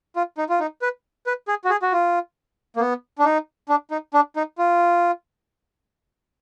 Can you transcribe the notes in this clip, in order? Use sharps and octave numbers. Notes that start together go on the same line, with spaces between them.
F4
D#4
F4
D#4
B4
B4
G#4
F#4
G#4
F#4
F4
A#3
B3
D4
D#4
D4
D#4
D4
D#4
F4